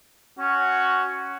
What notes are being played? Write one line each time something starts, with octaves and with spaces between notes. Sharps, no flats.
C#4 F#4